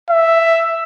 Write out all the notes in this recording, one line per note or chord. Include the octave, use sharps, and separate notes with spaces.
E5